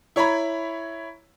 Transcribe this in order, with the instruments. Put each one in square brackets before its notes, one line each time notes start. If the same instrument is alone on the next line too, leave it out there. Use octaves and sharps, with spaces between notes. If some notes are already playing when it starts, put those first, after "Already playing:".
[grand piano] E4 C#5 A#5 B5